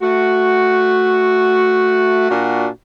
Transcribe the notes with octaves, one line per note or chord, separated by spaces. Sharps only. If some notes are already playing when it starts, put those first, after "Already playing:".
A3 F#4
A#2 D4 F#4